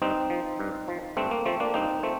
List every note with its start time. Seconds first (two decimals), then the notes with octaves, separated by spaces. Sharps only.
0.02 G2 C4 D#4
0.30 F3
0.59 G2
0.88 F3
1.17 G2 A3 C4
1.31 A#3
1.46 F3 A3 C4
1.60 A#3 D4
1.74 G2 C4 D#4
2.03 F3 A3 C4